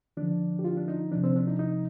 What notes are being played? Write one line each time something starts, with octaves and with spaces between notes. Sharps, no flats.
D3 F3 D4
G4
F4
D4
D#4
C3 F3 D4
C4
D4
D#4
D#4